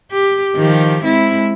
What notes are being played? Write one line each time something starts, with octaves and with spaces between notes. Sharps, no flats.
G4
D#3 F3 G4
G#3 C4 E4